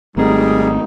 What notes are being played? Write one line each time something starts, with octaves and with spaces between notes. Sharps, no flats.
G#1 G3 A3 C4 D#4 G#4 A#4